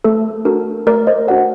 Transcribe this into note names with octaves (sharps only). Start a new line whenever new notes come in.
A3 A4
D4 F#4 A4 A#4
A3 A#4 D5
C5 D#5
D4 F#4 A4 D5 F#5